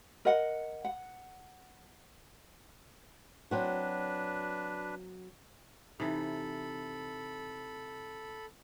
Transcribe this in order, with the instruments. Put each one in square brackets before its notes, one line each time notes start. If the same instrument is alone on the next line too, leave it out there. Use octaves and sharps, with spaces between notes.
[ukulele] A#4 D#5 F#5
F#5
[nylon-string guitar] F#3 C4 F#4 [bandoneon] D4 B4
[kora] C3 E3 [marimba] D#4 [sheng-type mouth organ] A4 B5